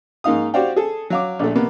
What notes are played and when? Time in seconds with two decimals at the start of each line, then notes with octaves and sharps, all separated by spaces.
0.24 G#2 A#3 D#4 F5 D#6
0.54 F#4 G4 C5 D5 F5 G5
0.76 G#4 A4
1.10 F#3 F5 D6
1.39 A#1 A#2 A3
1.55 C3 A#3 B3